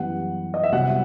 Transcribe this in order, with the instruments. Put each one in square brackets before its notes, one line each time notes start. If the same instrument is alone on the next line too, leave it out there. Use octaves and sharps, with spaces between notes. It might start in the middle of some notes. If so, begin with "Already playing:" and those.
Already playing: [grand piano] F#2 E3 G3 B3 F#5
D#5
E5
C2 C3 F#3 B3 F#5